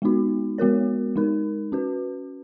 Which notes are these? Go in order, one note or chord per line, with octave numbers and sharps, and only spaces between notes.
G#3 B3 D#4 F#4
G#3 B3 F#4 A#4 C#5
G#3 D#4 A#4
C#4 F#4 B4